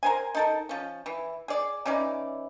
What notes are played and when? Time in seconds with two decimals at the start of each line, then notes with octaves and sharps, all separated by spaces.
0.03 A#4 C5 G#5
0.35 D#4 A4 A#4
0.69 F3 C#4
1.06 E3
1.48 G#4 D5
1.86 E3 C#4 D#4 D5